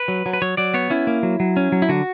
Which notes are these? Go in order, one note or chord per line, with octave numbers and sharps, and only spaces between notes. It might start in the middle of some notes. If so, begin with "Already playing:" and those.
Already playing: B4
F#3
F#3
B4
F#3 C#5
F#3 D5
B3 C#5
C#4 E4
A#3
F#3
F#3
C#4
F#3
E4
D3 F#4